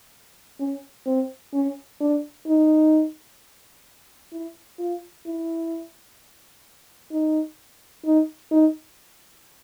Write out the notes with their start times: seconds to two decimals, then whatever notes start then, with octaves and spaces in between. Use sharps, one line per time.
0.60 C#4
1.06 C4
1.54 C#4
2.00 D4
2.47 D#4
4.32 E4
4.79 F4
5.26 E4
7.12 D#4
8.05 D#4
8.51 D#4